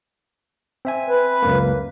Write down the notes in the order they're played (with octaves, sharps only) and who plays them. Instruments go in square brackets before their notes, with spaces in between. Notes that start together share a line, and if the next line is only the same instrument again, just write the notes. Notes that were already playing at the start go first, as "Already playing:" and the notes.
[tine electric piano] C4 E5 G#5
[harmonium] B4
[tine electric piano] C#2 F#2 A#3